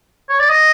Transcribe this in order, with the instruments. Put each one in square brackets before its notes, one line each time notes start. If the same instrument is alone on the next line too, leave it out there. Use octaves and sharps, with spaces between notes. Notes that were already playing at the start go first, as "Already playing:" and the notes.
[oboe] C#5
D5
D#5